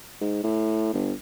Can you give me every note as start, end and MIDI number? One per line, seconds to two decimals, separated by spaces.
0.21 0.42 44
0.44 0.90 45
0.94 1.12 31